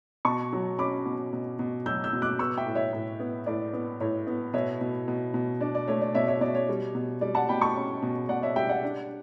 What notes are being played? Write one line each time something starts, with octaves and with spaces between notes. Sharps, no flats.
B2 A5 C#6
F#3
C#4 B5 D6
B2
B2
B2
F#3 E6 G6
E6 G6
B2
D6 F#6
B3 C#6 E6
E5 G5
A2
C#5 E5
A2
B3
A2 D5
B3
A2 C#5
B3
B2 C#5 E5
B2
B2
B2
D4 D5
D5
A3 C#5
D5
B2 C#5 E5
C#5 E5
B2 D5
C#5
G3
B2
G3 D5
F#5 A5
B2 G5 B5
A5 C#6
C#4
B2
B2 D5 F#5
C#5 E5
G3 E5 G5
D5 F#5
D4